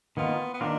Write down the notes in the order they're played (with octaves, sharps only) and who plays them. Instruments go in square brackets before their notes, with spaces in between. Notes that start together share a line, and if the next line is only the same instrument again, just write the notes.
[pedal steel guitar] D#3 A#3 F4 [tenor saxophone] B3
[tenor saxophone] B3
[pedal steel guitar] D#3 A#3 F4 [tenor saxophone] D4